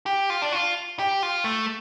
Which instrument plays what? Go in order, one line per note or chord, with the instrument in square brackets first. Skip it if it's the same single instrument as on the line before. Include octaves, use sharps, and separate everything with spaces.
[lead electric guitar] G4
F4
D4
F4
G4
F4
A3